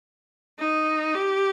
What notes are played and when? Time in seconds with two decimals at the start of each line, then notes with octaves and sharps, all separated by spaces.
0.59 D#4
1.15 G4